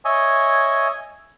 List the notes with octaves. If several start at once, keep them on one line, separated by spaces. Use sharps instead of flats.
C#5 D#5 E5 G#5